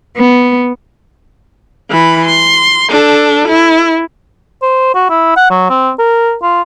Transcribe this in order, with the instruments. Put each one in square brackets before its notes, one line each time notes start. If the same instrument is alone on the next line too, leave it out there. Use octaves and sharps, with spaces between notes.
[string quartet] B3
[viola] E3 B5
C6
D4 A4
E4
[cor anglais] C5
F#4
E4
F#5
F#3
C4
A#4
F4